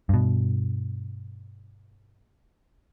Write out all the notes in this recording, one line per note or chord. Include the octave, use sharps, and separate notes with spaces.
G2 B2